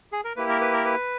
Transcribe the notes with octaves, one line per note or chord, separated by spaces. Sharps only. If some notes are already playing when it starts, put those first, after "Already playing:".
G#4
A#4
A#3 E4 G4 B4
A#4
B4
A#4
B4